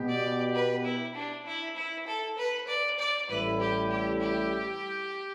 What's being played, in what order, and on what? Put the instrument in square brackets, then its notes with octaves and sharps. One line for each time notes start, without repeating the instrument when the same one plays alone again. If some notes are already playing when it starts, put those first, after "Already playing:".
Already playing: [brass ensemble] B2 B3 G4
[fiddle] D5
B4
E4
D4
E4
E4
A4
B4
D5
D5
[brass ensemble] A1 A2 G3 E4 [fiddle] B4
[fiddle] G4
G4
G4